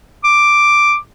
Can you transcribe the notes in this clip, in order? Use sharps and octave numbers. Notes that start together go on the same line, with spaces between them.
D6